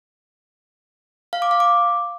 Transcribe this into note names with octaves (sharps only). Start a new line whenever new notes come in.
F5
D6
F5
D6